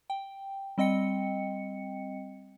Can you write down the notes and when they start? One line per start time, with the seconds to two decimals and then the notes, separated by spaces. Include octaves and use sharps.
0.10 G5
0.78 G3 C4 D#5 G5 C#7